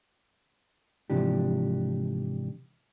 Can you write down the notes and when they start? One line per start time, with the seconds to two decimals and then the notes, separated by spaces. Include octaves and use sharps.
1.10 G#2 C3 E3 F3 D4 G4